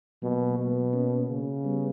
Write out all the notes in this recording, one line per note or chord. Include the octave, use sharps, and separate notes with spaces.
B2 F#3 A#3
B2
A#3 C#4
C#3
G3 B3